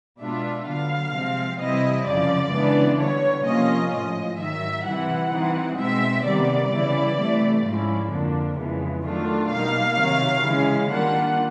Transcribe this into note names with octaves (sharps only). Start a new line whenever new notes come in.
B2 G#3 B3 D4 F4 E5
D3 F#3 B3 F5
C3 F3 G#3 C4
C3 E3 G3 C4 E4 D#5
F#2 C#3 F3 D5
C#3 E3 G#3 B3 D4
D3 G3 B3 C#5
C3 F3 A#3 C#4 F4 D#5
A2 F3 G#3 D#5
G#2 D#3 F#3 E5
C3 E3 G3 F#5
E3 G3 C4 D#4
B2 G#3 C4 E5
C3 D#3 G3 B3 D5
C#3 E3 G3 B3 E4
C3 E3 A3
G#2 F3 G#3 C#4 E4
F2 D3 F3 A#3 D4
F2 C#3 E3 G#3 B3
D#3 F#3 A3 D4 F4
B2 G3 A#3 D#4 F5
C3 D#3 F#3
C#3 E3 G#3 C#4
D#3 G3 A#3 D4 F4 F#5